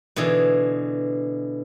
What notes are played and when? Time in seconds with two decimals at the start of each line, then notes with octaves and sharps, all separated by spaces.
0.16 B2 D3 E3 G#4